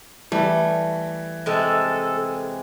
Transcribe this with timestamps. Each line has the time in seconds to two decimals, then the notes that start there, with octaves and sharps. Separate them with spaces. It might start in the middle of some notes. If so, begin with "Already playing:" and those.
0.32 E3 G3 A3
1.46 C3 G#3 A4